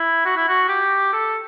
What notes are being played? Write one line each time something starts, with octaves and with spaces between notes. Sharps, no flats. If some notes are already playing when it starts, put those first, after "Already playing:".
Already playing: E4
F#4
E4
F#4
G4
A4